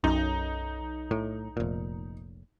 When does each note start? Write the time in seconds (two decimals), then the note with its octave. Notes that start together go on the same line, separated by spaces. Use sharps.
0.04 B1 F#2 D#4
1.11 A2
1.57 F1 A#2